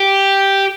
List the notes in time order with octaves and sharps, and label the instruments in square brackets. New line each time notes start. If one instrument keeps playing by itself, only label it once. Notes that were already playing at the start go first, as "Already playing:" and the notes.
Already playing: [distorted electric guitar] G4